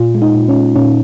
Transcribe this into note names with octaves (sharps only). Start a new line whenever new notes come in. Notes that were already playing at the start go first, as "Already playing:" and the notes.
Already playing: A#2 F4
G#3
D#4
A#2
C#4
G#3
A#2 C#4